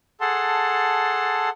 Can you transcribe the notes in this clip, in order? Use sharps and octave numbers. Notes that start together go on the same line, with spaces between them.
G#4 A4 F#5 A5 C6